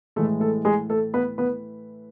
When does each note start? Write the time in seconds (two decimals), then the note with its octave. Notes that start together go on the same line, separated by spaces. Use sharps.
0.16 A2 E3 G#3 A3 A4
0.40 A3 A4
0.65 G#3 G#4
0.90 A3 A4
1.14 B3 B4
1.38 B3 B4